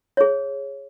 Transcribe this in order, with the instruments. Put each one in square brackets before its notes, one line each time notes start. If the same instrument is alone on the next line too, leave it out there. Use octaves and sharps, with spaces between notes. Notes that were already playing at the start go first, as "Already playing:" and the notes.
[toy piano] G#4 C#5